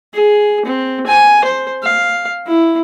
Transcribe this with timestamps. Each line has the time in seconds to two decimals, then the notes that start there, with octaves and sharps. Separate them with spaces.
0.14 G#4
0.65 C4
1.06 G#5
1.44 C5
1.83 F5
2.47 E4